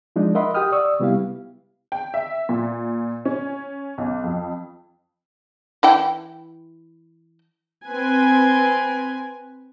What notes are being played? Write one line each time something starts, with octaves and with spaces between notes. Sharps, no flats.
F3 G#3 D4 D#4
A#4 D#5 E5 F#5 B5 C6
G4 F#5 G5 D#6 F6
D5 C#6 D#6 E6
C3 G3 B3 E4 G4 F5
G5
E5
A#2
C#4
B1
F2
E3 E4 G5
C4 B4 G#5